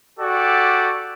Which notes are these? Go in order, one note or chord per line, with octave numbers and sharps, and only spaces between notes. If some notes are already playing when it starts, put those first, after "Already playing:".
F#4 G4 A4 D5